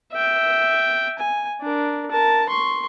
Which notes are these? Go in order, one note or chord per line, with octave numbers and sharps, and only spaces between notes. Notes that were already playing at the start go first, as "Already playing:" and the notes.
E5 G5
G#5
D4 A#4
A#4 A5
C6 C#6